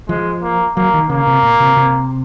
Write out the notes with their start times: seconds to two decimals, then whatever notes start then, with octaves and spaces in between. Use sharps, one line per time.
0.09 F3 G#3
0.42 A#3
0.76 F#3 A#3
0.94 D#3
1.09 C#3 A#3
1.27 C3
1.43 A#2
1.60 C3
1.77 C3